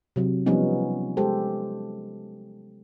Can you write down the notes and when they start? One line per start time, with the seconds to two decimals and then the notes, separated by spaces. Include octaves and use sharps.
0.16 C3 F#3
0.46 F3 G3 B3 C#4 D#4
1.17 G#3 G4 A4 C5